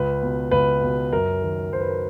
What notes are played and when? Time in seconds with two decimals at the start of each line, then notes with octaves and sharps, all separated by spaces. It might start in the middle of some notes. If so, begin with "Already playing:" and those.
Already playing: C#2 B4
0.22 B2
0.51 C#2 B4
0.82 B2
1.12 F#2 A#4
1.42 D#3
1.71 F#2 C5
1.81 B4
1.88 A#4